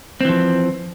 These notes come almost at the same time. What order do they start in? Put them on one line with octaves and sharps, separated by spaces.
C4 E3 F3